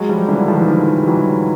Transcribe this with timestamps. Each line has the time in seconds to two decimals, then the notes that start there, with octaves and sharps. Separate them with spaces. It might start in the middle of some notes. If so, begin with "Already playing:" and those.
Already playing: F#3 G#3
0.09 F3 G3
0.28 D3 E3
0.48 D#3 F3
0.59 E3
0.67 D#3 F3
0.97 G3
1.06 E3 F#3